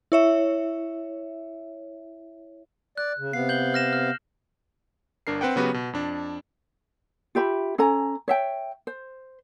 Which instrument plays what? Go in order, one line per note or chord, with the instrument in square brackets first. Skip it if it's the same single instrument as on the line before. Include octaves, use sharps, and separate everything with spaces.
[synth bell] E4 C#5 E5
[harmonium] D5 [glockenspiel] F#6
[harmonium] C#3
[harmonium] C3 B3 F5 [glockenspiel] C7
[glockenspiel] G6 F#7 G7
F6 A#6 E7
F6
[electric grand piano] G1 D4 A#4 C7
C4 B4 F#5 G5
C#3 F#3 B3 F#4 G4 B4
B2
F2 D4
[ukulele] F4 G4 E5 B5
C#4 A4 G#5 A#5
C#5 E5 G5
C5